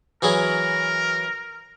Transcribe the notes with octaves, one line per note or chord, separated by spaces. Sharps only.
E3 F#3 G#4 A#4